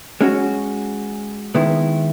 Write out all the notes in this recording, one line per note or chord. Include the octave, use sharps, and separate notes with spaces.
G#3 C#4 F#4
D#3 G#3 B3 E4